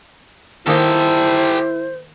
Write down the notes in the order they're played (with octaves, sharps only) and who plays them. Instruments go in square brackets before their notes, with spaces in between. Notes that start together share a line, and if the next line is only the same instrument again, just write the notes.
[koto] D#3 A#3 D#4 [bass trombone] E4 [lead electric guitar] G4 A4 [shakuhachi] C5